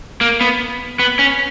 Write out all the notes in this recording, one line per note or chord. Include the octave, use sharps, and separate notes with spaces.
A#3
B3
B3
C#4